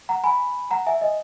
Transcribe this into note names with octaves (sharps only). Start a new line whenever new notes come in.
F#5 A#5
G#5 B5
F#5 A#5
E5 G#5
D#5